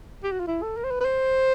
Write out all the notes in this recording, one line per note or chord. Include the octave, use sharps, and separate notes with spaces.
G4
F#4
F4
E4
A4
A#4
C5
B4
B4
C5